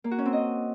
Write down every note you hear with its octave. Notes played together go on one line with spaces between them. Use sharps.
A#3
F#4
C#4
C4
D#5